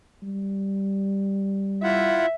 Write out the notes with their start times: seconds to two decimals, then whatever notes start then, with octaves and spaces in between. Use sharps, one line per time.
0.23 G3
1.83 E4 F4 E5 F#5